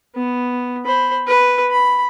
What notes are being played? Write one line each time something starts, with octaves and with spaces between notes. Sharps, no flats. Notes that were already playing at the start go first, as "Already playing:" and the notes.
B3
C5 B5
B4
B5